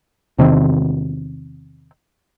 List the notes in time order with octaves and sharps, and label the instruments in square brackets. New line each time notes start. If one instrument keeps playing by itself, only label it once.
[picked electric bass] E2 C3 D#3 C4